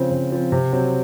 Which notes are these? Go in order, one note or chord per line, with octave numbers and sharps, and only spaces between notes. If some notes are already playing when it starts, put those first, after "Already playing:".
Already playing: C#3 F3 C4
C#3
F3 C4
C3
F#3 C4